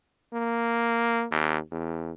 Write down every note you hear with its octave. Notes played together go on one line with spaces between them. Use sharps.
A#3
D#2
E2